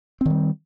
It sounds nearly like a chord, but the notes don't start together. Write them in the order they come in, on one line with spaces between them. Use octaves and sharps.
C4 D#3 G3